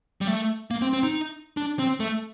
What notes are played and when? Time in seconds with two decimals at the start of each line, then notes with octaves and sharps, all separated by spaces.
0.21 G3
0.27 A3
0.71 A#3
0.82 C4
0.93 C4
1.03 D#4
1.57 D4
1.79 C4
2.00 A3